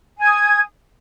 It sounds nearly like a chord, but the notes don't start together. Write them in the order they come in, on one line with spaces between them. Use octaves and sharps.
G#5 G#6 D#6